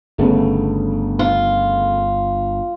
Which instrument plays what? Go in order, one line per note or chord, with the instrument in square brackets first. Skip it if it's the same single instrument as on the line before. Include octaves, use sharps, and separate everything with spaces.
[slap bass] G1 [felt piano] C#3 A3 B3
[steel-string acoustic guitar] F4